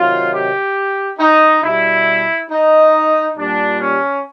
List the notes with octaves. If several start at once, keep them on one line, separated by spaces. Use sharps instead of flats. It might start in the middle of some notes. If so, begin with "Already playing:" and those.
Already playing: C3 D#3 F#3 F4
G4
D#4
B2 G3 E4
D#4
A#2 G3 D4
C#4